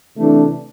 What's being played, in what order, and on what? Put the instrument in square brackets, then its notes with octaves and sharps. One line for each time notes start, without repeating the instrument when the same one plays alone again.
[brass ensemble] C3 E3 A3 D4